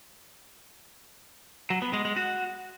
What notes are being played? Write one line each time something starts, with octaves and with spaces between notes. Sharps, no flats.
F#3
B3
G#3
G#3
F#4